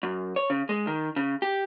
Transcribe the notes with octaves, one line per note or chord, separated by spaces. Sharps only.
F#2
C#5
C#3
G#3
D#3
C#3
G4